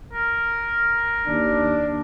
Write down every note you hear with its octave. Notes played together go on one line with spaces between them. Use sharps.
A#4
D#2 D4